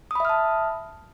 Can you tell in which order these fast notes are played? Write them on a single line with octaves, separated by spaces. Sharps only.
D#6 B5 E5 F6 A5